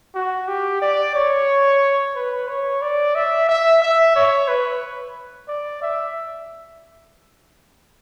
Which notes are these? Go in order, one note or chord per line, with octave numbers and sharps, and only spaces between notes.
F#4
G4
D5
C#5
B4
C#5
D5
E5
E5
E5
C#5
B4
D5
E5